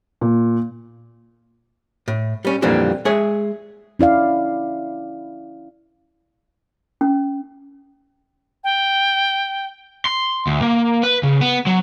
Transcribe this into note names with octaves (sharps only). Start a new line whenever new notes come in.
A#2
A2
G3 C#4
F2 A#2 D3 E3 G3 C4
G#3 G#4 C#5 E5
C#4 E4 D5 F5
C#4
G5
C6
D2
A#3
B4
C#3
B3
F#3